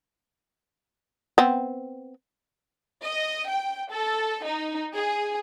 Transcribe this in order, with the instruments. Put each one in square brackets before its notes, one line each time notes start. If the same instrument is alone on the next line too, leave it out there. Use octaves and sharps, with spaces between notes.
[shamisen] B3 C4
[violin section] D#5
G5
A4
D#4
G#4